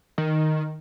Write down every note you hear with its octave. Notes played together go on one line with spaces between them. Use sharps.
D#3